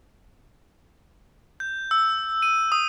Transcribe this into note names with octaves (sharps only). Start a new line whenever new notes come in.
G6
E6
D#7
D#6